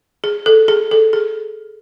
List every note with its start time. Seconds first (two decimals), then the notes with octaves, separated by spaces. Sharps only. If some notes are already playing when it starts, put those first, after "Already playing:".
0.24 G#4
0.46 A4
0.68 G#4
0.91 A4
1.13 G#4